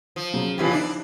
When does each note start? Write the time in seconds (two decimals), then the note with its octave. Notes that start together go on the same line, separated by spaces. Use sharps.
0.16 F3
0.34 C#3 F#3
0.58 F2 C#3 E3 F3 E4 G4
0.73 D4 D#4